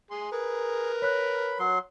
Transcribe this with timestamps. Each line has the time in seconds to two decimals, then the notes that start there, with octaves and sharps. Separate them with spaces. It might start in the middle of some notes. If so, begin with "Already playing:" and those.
0.11 G#4 C6
0.32 G#4 A#4 B4
1.02 C#5 B5 F#6
1.59 F#3 C6